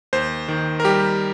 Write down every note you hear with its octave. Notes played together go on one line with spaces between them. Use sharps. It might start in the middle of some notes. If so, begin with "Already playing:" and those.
D#2 C5
D#3
A#4
G3 G4